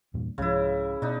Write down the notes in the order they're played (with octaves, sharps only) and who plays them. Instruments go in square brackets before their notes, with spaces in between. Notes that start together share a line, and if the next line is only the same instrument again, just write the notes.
[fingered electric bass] E2 G2 A#2
[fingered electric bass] C2 G#2 F3 [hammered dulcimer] C#3 E4
[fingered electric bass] B2 [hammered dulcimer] D4 D#4